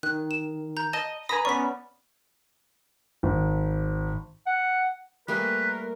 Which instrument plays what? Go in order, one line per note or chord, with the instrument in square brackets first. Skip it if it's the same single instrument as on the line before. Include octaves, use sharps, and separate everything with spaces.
[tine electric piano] D#3 [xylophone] F#6
[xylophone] E7
A#5 G6
[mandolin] D#5 [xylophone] A5
[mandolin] B4 A#5 B5 [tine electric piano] G#5 A#6 [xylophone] D#6
[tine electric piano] B3 C#4 D5 [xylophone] C#6 B6
[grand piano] G#1
[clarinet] F#5
[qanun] G3 A3 G#5 [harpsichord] A#3 F4 D#5 [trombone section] A#4 [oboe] B4